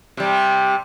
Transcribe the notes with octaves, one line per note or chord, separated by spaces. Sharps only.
C3 G3